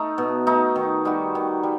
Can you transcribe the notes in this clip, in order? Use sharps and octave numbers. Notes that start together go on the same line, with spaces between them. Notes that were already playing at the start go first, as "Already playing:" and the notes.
Already playing: A3 D#4
B2
A3 D#4
D#3
G3 D#4 F#4
D#3
G3